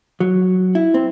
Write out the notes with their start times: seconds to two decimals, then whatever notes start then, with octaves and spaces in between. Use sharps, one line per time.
0.20 F#3
0.75 E4
0.94 C4